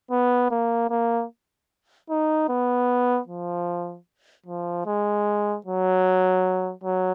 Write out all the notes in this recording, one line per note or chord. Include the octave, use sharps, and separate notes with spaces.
B3
A#3
A#3
D#4
B3
F3
F3
G#3
F#3
F#3